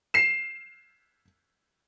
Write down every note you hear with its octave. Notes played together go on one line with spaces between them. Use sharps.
C7 E7